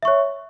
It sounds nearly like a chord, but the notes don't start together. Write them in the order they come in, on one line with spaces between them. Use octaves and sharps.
E5 C#6 C#5